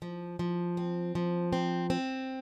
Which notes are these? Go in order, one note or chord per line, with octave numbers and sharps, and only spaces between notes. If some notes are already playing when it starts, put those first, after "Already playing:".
F3
F3
C4
F3
C4
C4